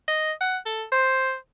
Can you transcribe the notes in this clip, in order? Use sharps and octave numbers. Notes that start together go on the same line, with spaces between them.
D#5
F#5
A4
C5